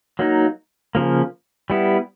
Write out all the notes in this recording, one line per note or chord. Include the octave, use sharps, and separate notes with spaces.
F#3 A#3 D#4
C#3 F3 A#3
G3 B3 E4